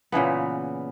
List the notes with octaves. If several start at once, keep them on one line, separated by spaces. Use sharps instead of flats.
A#2 C#3 E3 B3